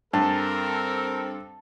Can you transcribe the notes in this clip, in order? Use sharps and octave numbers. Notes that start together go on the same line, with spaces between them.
G2 C4 A4 A#4 A5